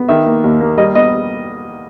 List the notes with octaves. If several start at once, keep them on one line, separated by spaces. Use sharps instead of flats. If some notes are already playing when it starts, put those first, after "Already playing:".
Already playing: B3
D#3 E5
A#3
D#2
A#3
G3 D#5
B3 D#5